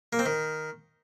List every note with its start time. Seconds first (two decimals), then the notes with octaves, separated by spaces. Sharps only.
0.13 A#3
0.19 C4
0.26 D#3